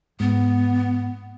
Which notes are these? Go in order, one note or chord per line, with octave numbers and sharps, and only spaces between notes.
G#2 B3